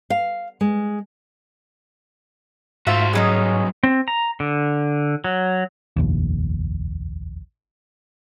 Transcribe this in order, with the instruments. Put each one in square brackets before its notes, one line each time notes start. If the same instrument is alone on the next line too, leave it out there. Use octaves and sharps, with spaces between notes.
[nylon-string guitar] F5
G#3
[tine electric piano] G#2 [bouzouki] F4 E5 F#5 [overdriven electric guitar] F#4 C5
[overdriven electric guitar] C2 F#3 [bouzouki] G#3 C#4 D#4
[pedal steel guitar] C4
A#5
D3
F#3
[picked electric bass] F1 A#1 D#2